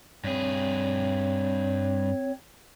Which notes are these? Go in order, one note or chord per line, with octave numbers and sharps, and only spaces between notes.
G2 C4 G#4 C#5